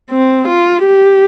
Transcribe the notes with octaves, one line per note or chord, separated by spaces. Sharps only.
C4
F4
G4